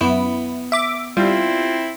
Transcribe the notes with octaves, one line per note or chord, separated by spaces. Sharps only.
F#2 B3 E4
E5 D6
G3 C4 E4 F4